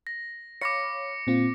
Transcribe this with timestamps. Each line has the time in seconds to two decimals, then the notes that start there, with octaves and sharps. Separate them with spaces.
0.07 A#6
0.61 C#5 F5 B5 D6 A#6 C#7
1.27 A#2 C4 F4